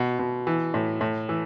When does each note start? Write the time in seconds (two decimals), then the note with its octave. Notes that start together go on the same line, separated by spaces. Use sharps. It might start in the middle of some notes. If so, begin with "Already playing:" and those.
Already playing: B2
0.19 B2
0.47 E3
0.74 A2
1.01 A2
1.29 E3